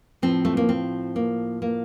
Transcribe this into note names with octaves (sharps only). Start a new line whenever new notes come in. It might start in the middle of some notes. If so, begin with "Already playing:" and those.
A2 F3 C4
A3
A#3
C4
A#3
A#3